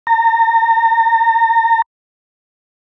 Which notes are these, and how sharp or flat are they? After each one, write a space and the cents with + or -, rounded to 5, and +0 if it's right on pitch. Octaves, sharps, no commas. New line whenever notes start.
A#5 -35